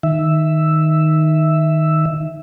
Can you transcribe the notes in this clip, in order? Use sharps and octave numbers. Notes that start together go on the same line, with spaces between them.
D#3 E5